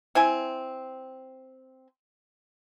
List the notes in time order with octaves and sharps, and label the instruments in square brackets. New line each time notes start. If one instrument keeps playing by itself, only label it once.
[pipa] C4 E4 G#5